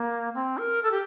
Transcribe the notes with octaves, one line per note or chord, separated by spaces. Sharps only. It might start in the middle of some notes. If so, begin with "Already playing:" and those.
Already playing: A#3
C4
A#4
A4
G4